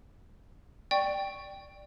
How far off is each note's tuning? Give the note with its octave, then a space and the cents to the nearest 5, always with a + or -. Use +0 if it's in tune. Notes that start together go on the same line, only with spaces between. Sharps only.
D5 +10 G5 +0 C#6 +0